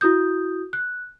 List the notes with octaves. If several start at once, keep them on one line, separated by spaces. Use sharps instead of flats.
E4 F#4 D#6 G6
F#6